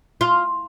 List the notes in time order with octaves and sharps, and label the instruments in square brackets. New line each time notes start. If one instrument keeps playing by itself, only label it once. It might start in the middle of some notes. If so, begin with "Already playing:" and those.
[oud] F4